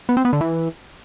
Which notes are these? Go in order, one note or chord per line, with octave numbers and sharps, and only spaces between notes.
B3
C4
B3
D3
E3